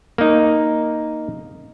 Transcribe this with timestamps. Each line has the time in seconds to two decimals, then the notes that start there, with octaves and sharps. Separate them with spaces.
0.18 A#3 D#4